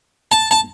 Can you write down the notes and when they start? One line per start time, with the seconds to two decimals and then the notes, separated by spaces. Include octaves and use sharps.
0.32 A5
0.51 A5